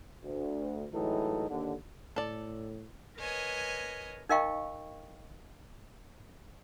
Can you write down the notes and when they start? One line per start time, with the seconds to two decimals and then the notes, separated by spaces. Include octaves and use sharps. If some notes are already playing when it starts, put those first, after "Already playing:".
0.23 D2
0.93 A2 E3 F#3 G#3 D#4 A4
1.50 D#2 D3
2.16 A2 A4 D5
3.19 A#4 B4 C#5 D#5 G#5
4.29 D#4 A#4 D#5 F5 G5 C#6